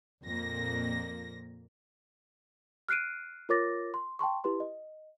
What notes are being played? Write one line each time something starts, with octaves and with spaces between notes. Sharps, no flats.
F2 A#2 A#3 A#6
F6 F#6 C7 D7 D#7
F4 A#4 C#5 D6 A6 A#6
C6
G5 A5 C6 C#6
E4 G4 B4 C6
D#5